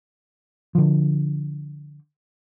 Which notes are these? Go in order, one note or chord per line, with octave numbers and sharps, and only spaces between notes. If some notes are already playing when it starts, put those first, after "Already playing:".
D3 F3